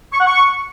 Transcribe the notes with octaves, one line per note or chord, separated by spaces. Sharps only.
C#6
F#5
C#6